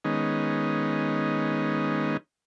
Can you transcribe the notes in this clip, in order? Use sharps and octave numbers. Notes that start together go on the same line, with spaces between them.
D#3 G#3 B3 C#4 D#4